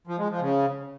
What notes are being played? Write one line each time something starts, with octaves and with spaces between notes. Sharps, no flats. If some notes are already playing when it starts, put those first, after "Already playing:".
F3
G#3
F3
C#3